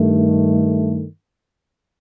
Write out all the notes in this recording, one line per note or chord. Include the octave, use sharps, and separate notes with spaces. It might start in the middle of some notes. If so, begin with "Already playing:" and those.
Already playing: G2 D#3 A3